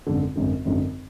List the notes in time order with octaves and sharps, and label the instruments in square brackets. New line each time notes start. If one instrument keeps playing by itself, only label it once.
[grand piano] G#1 F#2 D3
G#1 F#2 D3
G#1 F#2 D3